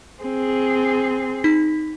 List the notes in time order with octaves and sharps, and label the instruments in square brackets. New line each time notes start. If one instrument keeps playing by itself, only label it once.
[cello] C4 G#4
[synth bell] D#4 B6